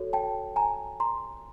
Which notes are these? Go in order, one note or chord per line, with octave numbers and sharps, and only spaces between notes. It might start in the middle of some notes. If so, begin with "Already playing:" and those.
Already playing: F#4 A4 C#5
G5 A5
G#5 A#5
A#5 C6